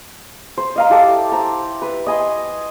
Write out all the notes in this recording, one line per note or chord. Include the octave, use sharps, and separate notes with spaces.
C5
D#5 F5 A#5
E4 G4 A4 D6
C5 A#5
B4
D#5 G#5 B5 C6